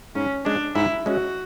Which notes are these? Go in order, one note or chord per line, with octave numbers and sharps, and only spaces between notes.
G#2 C#4
G#3 C#4 D4
G#2 E4
G#3 C#4 F#4